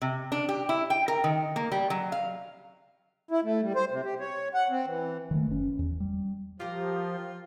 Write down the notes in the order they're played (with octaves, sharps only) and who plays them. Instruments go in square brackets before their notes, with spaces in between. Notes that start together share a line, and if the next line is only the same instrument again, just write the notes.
[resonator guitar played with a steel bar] C3
D4
G4
E4
G5
A#4
D#3
A#3
G3
F#3
F5
[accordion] E4
A3
G3
C5
C3
G4
C#5
F#5
C4
E3
[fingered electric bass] D#3 E3 A3
F#1 C#4
E2
G3
[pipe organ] F3 [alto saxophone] F4 [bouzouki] G4 A#4